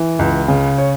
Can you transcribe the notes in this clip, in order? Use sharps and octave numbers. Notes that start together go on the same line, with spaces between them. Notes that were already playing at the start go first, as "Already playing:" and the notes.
Already playing: E3
C#2
C#3
C#5